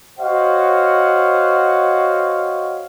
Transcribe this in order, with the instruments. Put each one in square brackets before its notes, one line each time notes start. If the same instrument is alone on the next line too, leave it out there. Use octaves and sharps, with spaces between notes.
[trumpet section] F#4 C5 C#5 D#5 F5 F#5